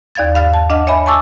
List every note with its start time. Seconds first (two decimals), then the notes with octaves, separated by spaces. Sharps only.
0.15 D#2 D5 F5 G#6 A6
0.34 G2 F5 F6 A6
0.54 A5
0.70 D4 D#5 F#5 F6
0.87 C#5 D#5 E5 G#5 B5
1.06 G#5 A5 C#6 D6 E6 A6